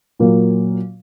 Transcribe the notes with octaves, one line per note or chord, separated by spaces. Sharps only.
A#2 F#3 A#3